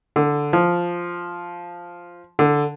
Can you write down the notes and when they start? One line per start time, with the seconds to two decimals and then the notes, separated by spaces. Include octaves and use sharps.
0.16 D3
0.53 F3
2.39 D3